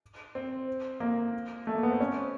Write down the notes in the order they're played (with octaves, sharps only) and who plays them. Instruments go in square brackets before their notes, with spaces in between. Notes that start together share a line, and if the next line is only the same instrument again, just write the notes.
[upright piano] C4
A#3
A3
A#3
B3
C4
C#4